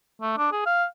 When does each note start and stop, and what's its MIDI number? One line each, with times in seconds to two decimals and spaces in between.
0.21 0.36 57
0.38 0.51 62
0.52 0.62 68
0.66 0.84 77